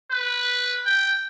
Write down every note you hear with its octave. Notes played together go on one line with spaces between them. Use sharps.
B4
G5